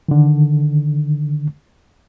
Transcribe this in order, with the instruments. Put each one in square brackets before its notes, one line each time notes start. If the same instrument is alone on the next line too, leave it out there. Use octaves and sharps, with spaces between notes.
[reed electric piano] D3 D#3